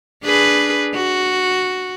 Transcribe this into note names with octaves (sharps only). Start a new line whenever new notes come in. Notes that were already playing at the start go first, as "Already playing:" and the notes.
D4 G#4 B4
F#4